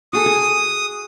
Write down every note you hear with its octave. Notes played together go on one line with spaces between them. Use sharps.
F#4 G#4 A4 D#6
G#4